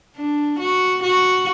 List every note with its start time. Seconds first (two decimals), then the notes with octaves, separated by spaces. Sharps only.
0.16 D4
0.59 F#4
1.03 F#4